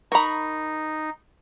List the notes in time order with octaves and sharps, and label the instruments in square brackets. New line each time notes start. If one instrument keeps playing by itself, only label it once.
[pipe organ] D#4 [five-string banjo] A#4 A#5 [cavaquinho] B5 C#6